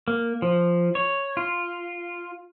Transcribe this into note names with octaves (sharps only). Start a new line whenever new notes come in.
A#3
F3
C#5
F4